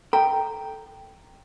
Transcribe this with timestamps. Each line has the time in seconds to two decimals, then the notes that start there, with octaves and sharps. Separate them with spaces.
0.13 A4 G5 A#5